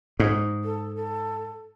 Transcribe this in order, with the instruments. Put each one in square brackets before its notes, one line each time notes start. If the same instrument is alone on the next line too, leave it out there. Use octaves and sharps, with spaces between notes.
[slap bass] G#2
[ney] A4
A4